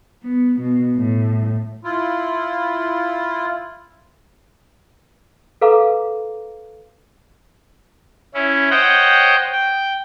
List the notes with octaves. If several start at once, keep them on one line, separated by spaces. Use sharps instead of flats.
B3
B2
A2
E4 F4
A4 B4 F5 A#5 D6
C#4 E4
C5 C#5 D#5 F#5 G5
G5